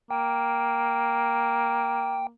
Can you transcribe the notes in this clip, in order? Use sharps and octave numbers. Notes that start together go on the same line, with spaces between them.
A#3 G5